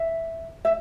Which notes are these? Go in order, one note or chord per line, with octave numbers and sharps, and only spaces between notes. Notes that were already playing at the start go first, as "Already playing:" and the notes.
Already playing: E5
E5